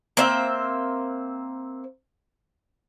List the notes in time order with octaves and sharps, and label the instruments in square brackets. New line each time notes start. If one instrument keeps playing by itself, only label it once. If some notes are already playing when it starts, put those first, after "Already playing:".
[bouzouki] A#3 C4 C5 E5